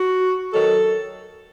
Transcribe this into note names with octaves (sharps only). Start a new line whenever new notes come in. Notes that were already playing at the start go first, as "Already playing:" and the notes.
Already playing: F#4
D#3 F#3 A4